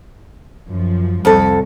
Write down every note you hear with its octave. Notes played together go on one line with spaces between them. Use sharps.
F#2 F3
C2 F2 A4